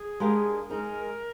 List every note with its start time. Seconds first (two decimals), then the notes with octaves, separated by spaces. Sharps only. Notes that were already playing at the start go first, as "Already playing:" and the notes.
Already playing: G#4
0.20 G#3 D4 G4 A#4 F5
0.69 G#3 D#4 G#4 A#4